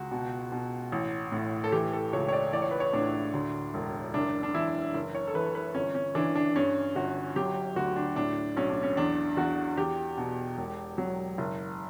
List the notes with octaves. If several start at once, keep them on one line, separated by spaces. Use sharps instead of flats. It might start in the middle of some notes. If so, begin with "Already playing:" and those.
Already playing: C#2 F#4
B2
B2
A1
A2
A4
E3 G4
A4
C#2 C#5
C#5
D5
A1 D5
C#5
B4
C#5
A2 D4
D2
E1
F#1 D4
D4
E3 E4
F#1
C#5
A4
E3 B4
B4
G1 C#4
C#4
E3 D4
D4
G2 C#4
G1 F#4
F#3 G4
D2 F#4
D4
A2 D4
B1 C#4
D4
C#4
E2 D4
E2 F#4
E2 G4
B2
E1
F#3
F#1